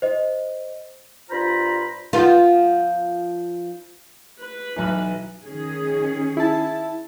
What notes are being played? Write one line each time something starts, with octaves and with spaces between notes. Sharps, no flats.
C5 D#5
G2 F4 C5 A#5 B5
F3 B3 F4
B4
B1 E3
D#3 C#4 G#4
E4 A5